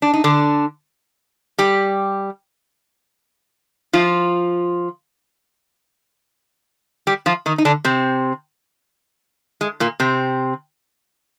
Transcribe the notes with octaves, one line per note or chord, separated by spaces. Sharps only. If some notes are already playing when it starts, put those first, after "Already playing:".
D4
D#4
D3 D4
G3 G4
F3 F4
G3 G4
F3 F4
D#3 D#4
D#4
D3 D4
C3 C4
G#3
A#2 A#3
C3 C4